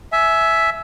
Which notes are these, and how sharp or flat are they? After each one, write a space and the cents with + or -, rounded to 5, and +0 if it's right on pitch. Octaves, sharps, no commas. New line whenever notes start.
E5 +0 G#5 +25